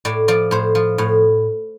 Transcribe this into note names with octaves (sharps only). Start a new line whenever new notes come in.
A2 D5
F3 D5
A2 C5
F3
A2